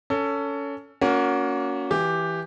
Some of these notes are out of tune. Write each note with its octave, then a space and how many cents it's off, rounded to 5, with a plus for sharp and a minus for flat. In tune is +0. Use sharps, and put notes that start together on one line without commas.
C#4 +20 A4 +20
A#3 +0 C#4 +25 F#4 -15
E3 +0 G4 +0